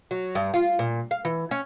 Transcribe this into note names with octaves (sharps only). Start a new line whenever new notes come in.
F#3
G2
F4
A#2
F5
E3
C#4